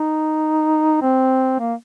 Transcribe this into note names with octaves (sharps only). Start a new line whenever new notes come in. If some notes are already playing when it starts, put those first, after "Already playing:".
Already playing: D#4
C4
A#3